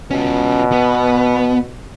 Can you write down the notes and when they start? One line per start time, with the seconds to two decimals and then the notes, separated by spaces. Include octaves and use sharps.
0.11 B2 C#4 F4
0.72 B3